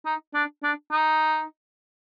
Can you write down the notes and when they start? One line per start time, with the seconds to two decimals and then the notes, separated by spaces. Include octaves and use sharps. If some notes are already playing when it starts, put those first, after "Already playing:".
0.06 D#4
0.34 D4
0.63 D4
0.92 D#4